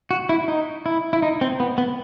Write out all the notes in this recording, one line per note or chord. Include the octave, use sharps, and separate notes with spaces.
F#4
E4
D#4
E4
E4
D#4
C4
B3
B3